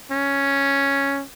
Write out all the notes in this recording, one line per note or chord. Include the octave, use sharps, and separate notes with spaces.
C#4